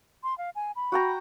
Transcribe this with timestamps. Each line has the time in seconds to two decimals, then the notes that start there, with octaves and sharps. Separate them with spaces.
0.23 C6
0.38 F5
0.55 G#5
0.76 B5
0.92 F#4 G5 A#5